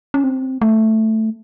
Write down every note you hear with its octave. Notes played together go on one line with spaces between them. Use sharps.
C#4
C4
A3